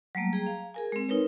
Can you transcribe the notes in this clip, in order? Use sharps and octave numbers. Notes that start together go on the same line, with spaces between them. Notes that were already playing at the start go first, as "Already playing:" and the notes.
F#3 G3 A3 A#3
G#4 G5 A#5
F5
G#4 A#4 G#5
G#3 C4
D#4 A#4 B4 C#5